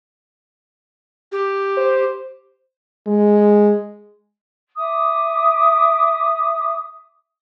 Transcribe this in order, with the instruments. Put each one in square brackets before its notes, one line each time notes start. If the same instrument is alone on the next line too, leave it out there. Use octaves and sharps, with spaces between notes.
[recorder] G4
[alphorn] C5
G#3
[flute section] E5 D6 D#6